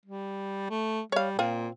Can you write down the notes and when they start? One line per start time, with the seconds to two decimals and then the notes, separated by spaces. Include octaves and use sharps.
0.06 G3
0.70 A3
1.12 G3 C#5 F5
1.39 A#2 C4 F4